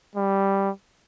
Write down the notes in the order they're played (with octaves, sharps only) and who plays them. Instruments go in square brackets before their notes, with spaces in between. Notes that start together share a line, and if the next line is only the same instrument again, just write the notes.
[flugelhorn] G3